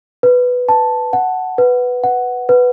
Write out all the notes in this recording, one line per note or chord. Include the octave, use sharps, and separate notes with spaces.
B4
A5
F#5
B4
F#5
B4